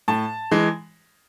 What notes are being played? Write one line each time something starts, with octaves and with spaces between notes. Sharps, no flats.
A2 A5
E3 G#3